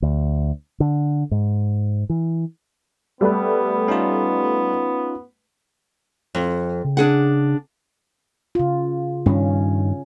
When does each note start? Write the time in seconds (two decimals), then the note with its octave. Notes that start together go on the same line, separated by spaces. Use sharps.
0.02 D2
0.80 D3
1.31 G#2
2.10 E3
3.21 G3 A3 B3 B4
3.88 C#4 D#4 F4
6.35 F2
6.85 C#3
6.97 D4 G#4 F#5
8.55 C#3 F4
9.26 G2 D#3 C#4